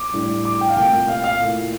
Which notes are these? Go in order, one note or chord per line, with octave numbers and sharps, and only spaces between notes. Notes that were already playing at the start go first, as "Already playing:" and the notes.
Already playing: D6
A2 G3 D4
D6
G5
F5
C2 A#2 A3 G5
F5
F5
A#2 A3 E4